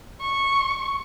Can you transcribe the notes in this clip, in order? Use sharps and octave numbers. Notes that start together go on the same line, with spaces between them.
C#6